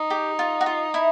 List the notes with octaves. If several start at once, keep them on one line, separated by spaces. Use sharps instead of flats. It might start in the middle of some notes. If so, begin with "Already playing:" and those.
Already playing: D#4
G4
F4
F#4
F4
E4